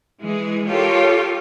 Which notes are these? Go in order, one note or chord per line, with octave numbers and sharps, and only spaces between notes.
E3 G#3 G#4
F4 G4 A4 A#4 C#5